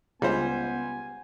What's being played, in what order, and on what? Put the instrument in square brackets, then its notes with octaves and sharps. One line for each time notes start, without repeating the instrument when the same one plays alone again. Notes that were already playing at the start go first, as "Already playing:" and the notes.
[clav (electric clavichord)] C#2 [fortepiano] G3 C5 [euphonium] B3 [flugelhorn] G#5